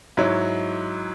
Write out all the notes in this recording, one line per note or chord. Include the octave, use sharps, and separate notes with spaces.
G#2 F#3 E4 C#5